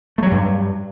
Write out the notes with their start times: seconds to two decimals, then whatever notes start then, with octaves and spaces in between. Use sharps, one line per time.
0.18 A3
0.23 F#3
0.27 G3
0.31 G2